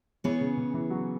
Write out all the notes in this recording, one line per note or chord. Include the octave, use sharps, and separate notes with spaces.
E3 B3 G#4 C#5
C#3
C#3
E3
F#3